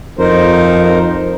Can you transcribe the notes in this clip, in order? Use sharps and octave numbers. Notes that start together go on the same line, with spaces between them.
F2 D#4 A#4 C5